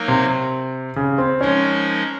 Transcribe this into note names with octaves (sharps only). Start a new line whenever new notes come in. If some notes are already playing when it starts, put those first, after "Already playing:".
Already playing: F#3 A#3 D#4 A#4
C3
C#3
C4
F3 G#3 C#4 D#4 A#4